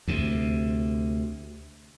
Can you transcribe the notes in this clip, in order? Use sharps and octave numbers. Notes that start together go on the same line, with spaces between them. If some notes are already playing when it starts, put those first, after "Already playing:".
D2 C3